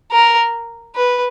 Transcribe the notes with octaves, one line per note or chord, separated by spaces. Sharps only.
A#4
B4